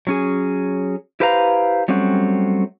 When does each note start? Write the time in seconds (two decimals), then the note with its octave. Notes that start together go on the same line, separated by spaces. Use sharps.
0.07 F#3 C#4 G#4
1.20 E4 G4 B4 C5 F5 A#5
1.88 F#3 G3 A3 C4 C#4 F#5